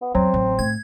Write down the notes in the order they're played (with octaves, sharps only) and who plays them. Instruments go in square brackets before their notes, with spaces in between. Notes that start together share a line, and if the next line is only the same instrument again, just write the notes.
[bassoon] B3
[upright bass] E2 [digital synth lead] F#3 [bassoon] C4
[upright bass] A1
[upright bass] A2 [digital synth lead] G#6